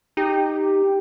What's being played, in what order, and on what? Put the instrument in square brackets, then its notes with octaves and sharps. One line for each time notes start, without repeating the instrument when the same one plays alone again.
[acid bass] D#4 [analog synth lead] G4